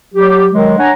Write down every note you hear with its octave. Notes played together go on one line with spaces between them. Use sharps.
F#3 G4
D#3 F#3 G#3
D4 C#5 F#5 G#5 A#5